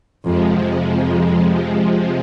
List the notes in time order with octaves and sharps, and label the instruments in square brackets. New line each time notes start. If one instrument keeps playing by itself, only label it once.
[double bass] F2 [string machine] C3 F3 G#3
[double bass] F2